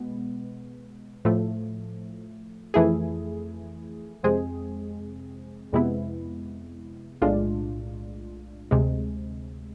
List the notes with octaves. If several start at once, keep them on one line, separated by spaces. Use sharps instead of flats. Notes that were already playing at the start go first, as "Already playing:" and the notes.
Already playing: B2 G#3 B3
A2 F3 A3
F2 E3 A3 E4 G#4
F2 C3 G#3 C4 G#4
F2 C3 G#3 B3 E4
B1 A2 G#3 D4 F4
D2 C3 G#3